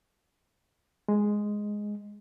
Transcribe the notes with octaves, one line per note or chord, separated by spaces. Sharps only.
G#3